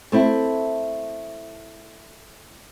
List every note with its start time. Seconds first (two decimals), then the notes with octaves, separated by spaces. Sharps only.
0.12 A3 C4 E4